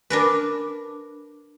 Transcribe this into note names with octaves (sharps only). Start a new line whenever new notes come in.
D4 A#4 B4